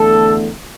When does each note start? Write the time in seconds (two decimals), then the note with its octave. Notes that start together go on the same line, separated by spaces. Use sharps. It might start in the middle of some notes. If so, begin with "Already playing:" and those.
Already playing: E2 D3 A3 A4